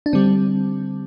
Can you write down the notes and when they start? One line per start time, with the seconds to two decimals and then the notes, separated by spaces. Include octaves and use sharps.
0.06 D4
0.13 D3 G3 C4